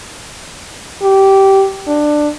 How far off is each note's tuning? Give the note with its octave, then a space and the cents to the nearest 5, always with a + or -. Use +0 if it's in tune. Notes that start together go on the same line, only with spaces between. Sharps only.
G4 -15
D4 +15